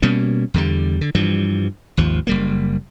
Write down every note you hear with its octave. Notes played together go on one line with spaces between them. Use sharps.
B2 G3 A#3 C#4
E2 D3 G3
D3
G2 E3 F3 G3
G#1 D#2 F3
F#1 G3 A#3